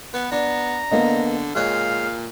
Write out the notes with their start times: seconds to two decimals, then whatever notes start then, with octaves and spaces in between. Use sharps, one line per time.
0.14 B3 B4
0.32 B3 D4 A#5
0.91 D3 A#3 B3 D#5
1.55 A#2 G#3 C#5 F5 F#6